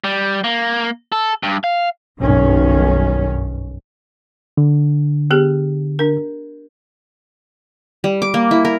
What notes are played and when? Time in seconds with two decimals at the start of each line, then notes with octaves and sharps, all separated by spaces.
0.04 G3
0.44 A#3
1.12 A4
1.43 G2
1.64 F5
2.21 F#1 B1 G2 D#3 C#4
4.57 D3
5.31 B3 G4 G#4
5.99 D4 A#4
8.04 G3
8.22 D6
8.34 A#3
8.51 E4
8.65 A#4